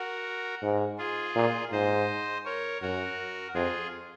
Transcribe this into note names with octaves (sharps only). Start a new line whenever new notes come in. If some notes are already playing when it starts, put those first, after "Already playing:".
Already playing: F#4 A#4
G#2
F4 G#4
A#2
G#2 C5 D#5
A#4 C#5
F#2 F#4 A#4
F2 F4 G#4